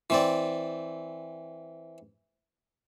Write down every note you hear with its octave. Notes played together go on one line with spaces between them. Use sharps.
E3 C4 D5